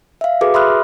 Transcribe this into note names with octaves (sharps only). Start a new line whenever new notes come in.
E5 F5
F#4 G#4 A4 B4 D6
E5 B5 C6 D#6 F6 F#6